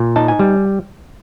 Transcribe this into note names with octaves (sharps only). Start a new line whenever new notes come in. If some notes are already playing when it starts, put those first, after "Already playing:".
Already playing: A#2
D#4 A5
G#5
G3